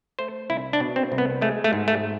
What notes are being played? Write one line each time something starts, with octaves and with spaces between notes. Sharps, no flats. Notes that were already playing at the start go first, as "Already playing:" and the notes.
A3 C5
C2 E4
D4
B2
C4
C2
B3
G#3 A3
A3
G#2
A3